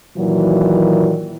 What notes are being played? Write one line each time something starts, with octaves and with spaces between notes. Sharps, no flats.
A#2 D#3 E3 F#3